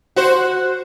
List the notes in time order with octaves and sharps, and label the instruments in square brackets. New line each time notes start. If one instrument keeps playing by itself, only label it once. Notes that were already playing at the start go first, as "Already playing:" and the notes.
[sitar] F#4 C5